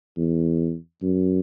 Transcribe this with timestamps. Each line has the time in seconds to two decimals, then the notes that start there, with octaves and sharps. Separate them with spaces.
0.17 E2
1.02 F#2